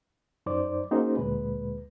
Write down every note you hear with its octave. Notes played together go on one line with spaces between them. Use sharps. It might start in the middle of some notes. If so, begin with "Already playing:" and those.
F#2 D#4 C5 D5 D6
A#3 C#4 D#4 F#4 G#4 C5
D2 A#2 G#3 B4